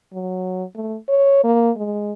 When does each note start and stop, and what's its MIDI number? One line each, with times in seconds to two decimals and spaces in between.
0.13 0.64 54
0.75 0.97 57
1.08 1.39 73
1.44 1.71 58
1.77 2.12 56